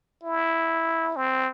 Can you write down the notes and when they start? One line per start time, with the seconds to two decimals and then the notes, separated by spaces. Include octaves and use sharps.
0.23 E4
1.16 C4